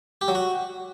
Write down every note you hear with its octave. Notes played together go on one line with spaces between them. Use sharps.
G4
F#3
F#4